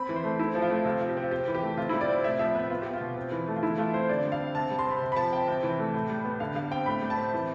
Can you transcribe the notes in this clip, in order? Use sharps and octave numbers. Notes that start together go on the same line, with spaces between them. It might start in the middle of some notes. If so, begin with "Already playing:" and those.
Already playing: C4 B5
E3
C5
A3
C4 E4
F3
F4
A3
C3 F4
F3
G4
C4
F4
C4 G4
E3
G4
A3
C3 F4
G3 E4
D5
C4
A2 E5
F3 E5
B3 B4
B3 F4
B3 G4
F4
B2
C4
E3
A3
F4
E3 E4
A3 F4
C4 C5
D3 D5
G3
F5
C4
C3 A5
G3
C6
C4 B5
C3
B5
F3 A5
C4 G5
C3
E3
A3
A2
G3
B3
D3 F5
G3 F5
C4 G5
A2 B5
G3
A5
C4
E3